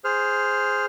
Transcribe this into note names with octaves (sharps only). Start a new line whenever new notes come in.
G#4 C5 F6